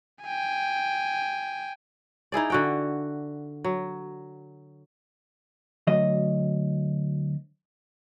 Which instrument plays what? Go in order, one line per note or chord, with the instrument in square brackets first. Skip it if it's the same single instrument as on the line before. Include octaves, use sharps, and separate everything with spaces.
[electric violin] G5 G#5
[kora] D#4 E4 G#4 D5
D3 F#4 G5
F#3
[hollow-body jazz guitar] D2 F#3 D#5